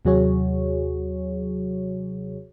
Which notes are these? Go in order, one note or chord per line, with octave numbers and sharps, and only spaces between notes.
D#2 C3 F#3 F#4 G#4 C#5